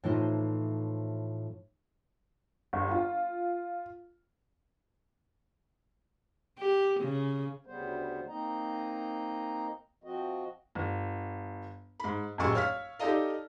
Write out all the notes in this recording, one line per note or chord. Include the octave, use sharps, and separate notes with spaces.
A2 E3 F3 D#4 C5
G1
F4
G4
C#3
D2 C#3 G3 B3 C5
A#3 C4 D#4 D#5 A#5
F3 C4 F#4 D#5
G1
G#2 B5
D#1 A1 F#2 G#4 C#6 E6
C#5 F5 F6 B6
D#4 G4 A4 D5 D#5 F5